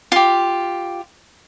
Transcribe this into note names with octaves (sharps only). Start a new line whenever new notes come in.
F4 G4